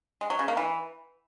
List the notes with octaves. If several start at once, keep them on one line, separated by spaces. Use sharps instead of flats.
G#3
F#3
C#3
A#3
E3